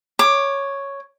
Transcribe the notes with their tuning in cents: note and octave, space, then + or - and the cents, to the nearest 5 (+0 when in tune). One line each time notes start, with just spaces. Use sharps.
C#5 +0 D6 +15